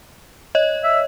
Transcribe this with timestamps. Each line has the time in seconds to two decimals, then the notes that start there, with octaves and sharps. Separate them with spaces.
0.55 C#5 D#5
0.84 E5